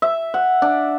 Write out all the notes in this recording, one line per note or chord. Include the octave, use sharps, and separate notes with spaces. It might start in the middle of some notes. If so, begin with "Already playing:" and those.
E5
F#5
D4